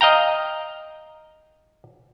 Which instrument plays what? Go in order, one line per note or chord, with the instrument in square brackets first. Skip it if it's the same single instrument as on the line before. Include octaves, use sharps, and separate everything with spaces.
[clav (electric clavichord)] D#5 F5 G5 A#5